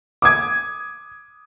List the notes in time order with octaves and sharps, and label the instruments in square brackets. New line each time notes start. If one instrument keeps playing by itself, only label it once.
[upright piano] D6 D#6 G#6